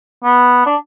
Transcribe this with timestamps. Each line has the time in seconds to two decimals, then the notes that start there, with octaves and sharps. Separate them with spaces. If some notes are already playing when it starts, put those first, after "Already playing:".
0.24 B3
0.66 D4